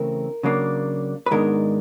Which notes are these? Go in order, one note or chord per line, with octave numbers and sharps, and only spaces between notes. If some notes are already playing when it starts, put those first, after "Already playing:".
Already playing: C#3 E3 A3 C4 A#4
C#3 F#3 A#3 D4
B4
G#2 D#3 G#3 B3 D4 A#4